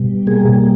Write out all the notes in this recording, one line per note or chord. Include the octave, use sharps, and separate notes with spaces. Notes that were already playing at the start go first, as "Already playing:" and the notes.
Already playing: B2 G3
A#3 G#4